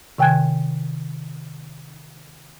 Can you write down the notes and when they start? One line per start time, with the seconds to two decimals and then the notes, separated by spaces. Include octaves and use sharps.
0.18 C3 D#3 G5 G#5 F#6 G#6